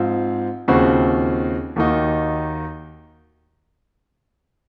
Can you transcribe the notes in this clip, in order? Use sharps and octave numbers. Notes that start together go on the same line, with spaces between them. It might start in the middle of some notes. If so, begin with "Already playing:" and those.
Already playing: G#2 F3 C4 F4
D#2 C#3 F3 C4 F#4
D#2 D#3 A#3 D#4 F#4